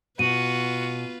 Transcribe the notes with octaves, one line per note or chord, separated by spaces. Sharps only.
B2 F4 F#4 B4 D#7